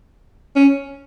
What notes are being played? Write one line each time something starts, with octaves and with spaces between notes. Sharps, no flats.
C#4